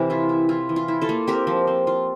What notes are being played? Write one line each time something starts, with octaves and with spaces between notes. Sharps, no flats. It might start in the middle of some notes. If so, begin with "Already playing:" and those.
Already playing: C3 E3 G4 A#4
E4 F4
E4
E4 F4
E3
F4
E4
F4 A4
A#3
C4 G4 A#4
F3
C4
F4